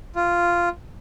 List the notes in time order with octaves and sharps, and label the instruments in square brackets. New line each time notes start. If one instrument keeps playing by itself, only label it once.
[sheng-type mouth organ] F4